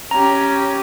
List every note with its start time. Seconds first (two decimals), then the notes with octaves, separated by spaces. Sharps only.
0.11 C#4 G4 A#5